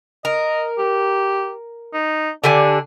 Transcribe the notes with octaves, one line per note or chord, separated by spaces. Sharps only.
A#4 D#5
G4
D#4
D3 D4 G4 G#5